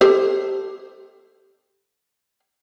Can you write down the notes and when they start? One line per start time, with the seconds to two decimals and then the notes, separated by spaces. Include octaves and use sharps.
0.01 G4 A4 C5